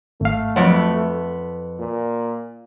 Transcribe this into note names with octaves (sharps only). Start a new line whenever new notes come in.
G#1 A3 F5
F2 F3 F#3 B3
A#2